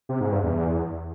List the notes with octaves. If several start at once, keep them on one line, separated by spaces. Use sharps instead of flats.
C3
G#2
G2
E2